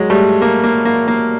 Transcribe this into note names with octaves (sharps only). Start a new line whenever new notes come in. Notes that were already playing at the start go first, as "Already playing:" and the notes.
Already playing: F#3 G#3
G3 A3
A#3
A#3
A#3
A#3